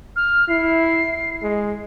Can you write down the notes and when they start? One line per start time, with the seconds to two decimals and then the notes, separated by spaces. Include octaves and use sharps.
0.16 F6
0.49 E4 C7
1.42 G#3